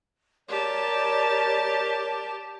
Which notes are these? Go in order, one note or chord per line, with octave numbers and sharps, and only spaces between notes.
G4 A#4 C#5 D5 A5